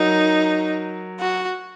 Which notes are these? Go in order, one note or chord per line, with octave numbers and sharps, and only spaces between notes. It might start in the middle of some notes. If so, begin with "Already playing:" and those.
Already playing: F#3 D#4 A#4
F#4